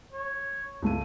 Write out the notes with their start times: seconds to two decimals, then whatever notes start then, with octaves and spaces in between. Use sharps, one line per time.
0.13 C#5
0.82 C#2 A3 D#7